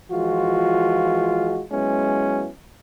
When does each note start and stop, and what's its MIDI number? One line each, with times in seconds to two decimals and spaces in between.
0.11 1.64 52
0.11 1.64 53
0.11 1.64 56
0.11 1.64 65
0.11 1.64 66
1.72 2.49 54
1.72 2.49 56
1.72 2.49 59
1.72 2.49 61
1.72 2.49 64